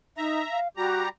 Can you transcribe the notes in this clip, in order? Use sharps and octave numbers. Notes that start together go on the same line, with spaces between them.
D#4 E5 A#5
F5
G3 F#4 G4 A#5